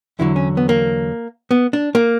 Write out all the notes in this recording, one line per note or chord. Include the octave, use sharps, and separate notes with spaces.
E2 D3 F#3 E4
C#4
B3
A#3
B3
D4
A#3